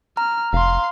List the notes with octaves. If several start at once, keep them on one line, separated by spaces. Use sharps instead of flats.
A#5 F6
F1 F5 C6